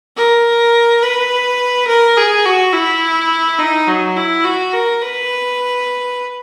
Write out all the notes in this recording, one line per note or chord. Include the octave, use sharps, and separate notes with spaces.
A#4
B4
A#4
G#4
F#4
E4
D#4
F#3
E4
F#4
A#4
B4